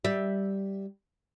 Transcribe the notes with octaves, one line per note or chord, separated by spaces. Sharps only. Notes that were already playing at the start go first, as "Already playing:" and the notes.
G3 E5